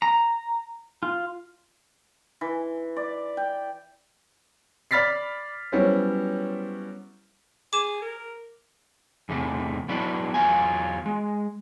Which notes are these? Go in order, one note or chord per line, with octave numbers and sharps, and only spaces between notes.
A#5
F4
E3
D5
G5
D5 B5 F6 A6 B6 C7
F#3 G3 B3 C#4 E4 C5
G#4 D6 E7
A#4
E2 C3 A3
F#3 B3 D4 E4 F#4
E2 F#3 F4 G#5
G#3